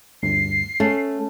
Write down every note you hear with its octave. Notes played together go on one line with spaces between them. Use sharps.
D2 G2 C7
A3 C#4